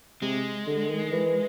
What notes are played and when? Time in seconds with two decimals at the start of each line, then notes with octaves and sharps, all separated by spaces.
0.22 C3 G#3
0.67 D3
0.90 D#3
1.12 E3